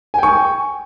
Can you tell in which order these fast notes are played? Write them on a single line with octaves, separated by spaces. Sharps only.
G#5 G5 C#6